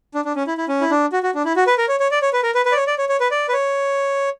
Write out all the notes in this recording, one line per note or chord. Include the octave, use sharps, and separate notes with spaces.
D4
D4
C#4
E4
E4
C#4
E4
D4
F#4
F#4
D4
E4
F#4
B4
A#4
C#5
C#5
D5
C#5
B4
A#4
B4
B4
D5
C#5
D5
C#5
C#5
B4
D5
B4
C#5